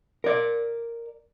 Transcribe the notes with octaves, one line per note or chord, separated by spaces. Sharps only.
A#4 D5